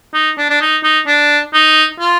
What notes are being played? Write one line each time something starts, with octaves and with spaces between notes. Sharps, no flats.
D#4
D4
D4
D#4
D#4
D4
D#4
F4